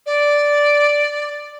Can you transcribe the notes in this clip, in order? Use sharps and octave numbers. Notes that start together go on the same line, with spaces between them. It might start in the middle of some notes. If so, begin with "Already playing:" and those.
D5